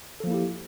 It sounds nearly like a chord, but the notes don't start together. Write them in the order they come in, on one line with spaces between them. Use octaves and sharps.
A4 F3 A#3 E4 G4